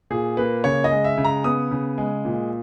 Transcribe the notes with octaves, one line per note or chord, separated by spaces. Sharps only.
A#2 G#4
A#3 B4
C#3 C#5
D#5
G#3
E5
C#3
A#5
B3 D#6
C#3
G#3
A#2